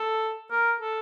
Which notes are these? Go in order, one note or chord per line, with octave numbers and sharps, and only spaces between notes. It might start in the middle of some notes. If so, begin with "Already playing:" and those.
Already playing: A4
A#4
A4